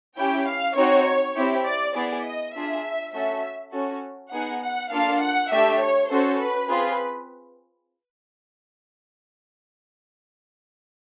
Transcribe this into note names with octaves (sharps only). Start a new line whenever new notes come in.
C#4 E4 G4 G5
F5
C4 D#4 F#4 C#5
C4 E4 G4
D5
B3 E4 G#4 D5
D#5
D4 F4 G#4 E5
A3 C#4 F#4 A4 E5
C#4 F#4 A4
B3 D#4 G#4 F#5
F#5
A#3 D4 F4 A4 F5
F#5
A3 D4 G4 E5
C#5
C#4 F#4 A4 C5
B4
C4 F4 G#4 B4